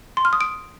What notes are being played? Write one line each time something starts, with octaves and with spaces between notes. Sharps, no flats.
C6
F6
D#6
D7